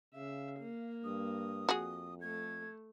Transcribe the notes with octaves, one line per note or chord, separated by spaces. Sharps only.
C#3 E5 F5
A#3
G2 D#6
F2 F#4 G#4
A3 G#6